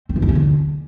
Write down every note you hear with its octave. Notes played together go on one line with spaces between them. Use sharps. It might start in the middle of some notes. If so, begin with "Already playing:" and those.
C4
E3
E4
C#4
D3